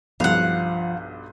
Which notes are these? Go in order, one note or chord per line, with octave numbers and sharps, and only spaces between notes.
B1 G2 F3 F5 F#5